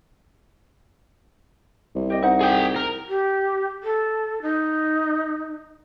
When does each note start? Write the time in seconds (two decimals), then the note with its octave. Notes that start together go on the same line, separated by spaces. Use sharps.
1.95 C2
2.10 G4 D#5
2.22 D#4 C5 F#5
2.41 G#4 G5
2.76 A#4
3.09 G4
3.84 A4
4.42 D#4